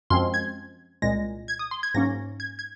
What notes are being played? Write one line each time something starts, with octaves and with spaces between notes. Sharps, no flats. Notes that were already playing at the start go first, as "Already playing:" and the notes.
F#2 F3 G#3 C4 C6
G#6
C2 A#2 G#3 A#6
G#6
D#6
C6
G#6
G#2 F#3 A#3 C#4 A#6
G#6
G#6